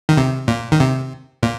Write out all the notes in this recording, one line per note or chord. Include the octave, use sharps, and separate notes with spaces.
D#3
C3
A#2
D#3
C3
A#2